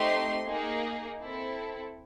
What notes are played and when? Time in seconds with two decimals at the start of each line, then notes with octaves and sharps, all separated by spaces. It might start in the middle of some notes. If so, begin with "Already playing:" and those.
Already playing: A3 C4 D#4 G4 C6
0.47 A#3 D#4 G#4
1.20 C4 E4 A4